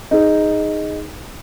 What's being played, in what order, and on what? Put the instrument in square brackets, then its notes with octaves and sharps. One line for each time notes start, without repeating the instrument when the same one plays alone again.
[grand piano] D#4 G#4